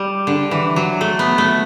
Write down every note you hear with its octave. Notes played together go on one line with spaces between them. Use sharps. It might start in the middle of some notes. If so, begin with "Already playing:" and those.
Already playing: G3
D3
E3
F#3
A3
B3
A3